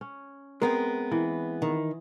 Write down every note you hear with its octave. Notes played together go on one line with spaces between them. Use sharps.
C#4
G#3 B3 C4 A#4
E3
D#3